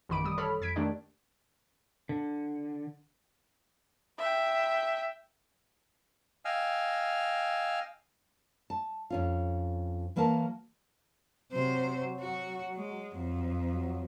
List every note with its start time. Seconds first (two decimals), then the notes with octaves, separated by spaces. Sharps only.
0.09 A1 F#2 D#3 B5 D6 D7
0.25 G3 D#6
0.38 A4 C#5 B5 F6
0.61 F2 G#6 B6 D7
0.76 D#3 A3 D4 G4 D5
2.09 D3
4.18 E5 G5
6.45 D#5 F5 G5 G#5 E6 F6
8.70 A5
9.10 F2 C#4 F4
10.16 E3 F#3 A#3 A#4 A5
11.52 C3 F#3 C5
12.20 F#4
12.76 G#3
13.16 F2
13.70 F#3